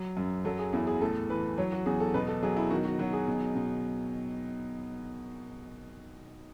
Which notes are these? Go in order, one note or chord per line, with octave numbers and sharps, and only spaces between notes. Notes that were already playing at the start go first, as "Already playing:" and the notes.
Already playing: F#3
F#2
F#3 A4
G#4
E2 E4
G#4
A2 A4
E3 B4
F#3 C#5
F#4
E2 G#4
A4
B2 B4
A4
F#3 G#4
E4
D#3 F#4
F#4
F#3 F#4
G#4
B2
B2